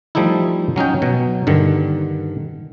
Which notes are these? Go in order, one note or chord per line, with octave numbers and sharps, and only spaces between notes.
F3 G3 A3 D#4 E4
F#3 C#4 D#4 G5
B2 F#3
G2 D3 D#3